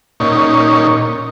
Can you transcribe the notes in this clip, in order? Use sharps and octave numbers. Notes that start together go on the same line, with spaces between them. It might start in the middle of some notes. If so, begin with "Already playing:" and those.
A#2 C#4 D#4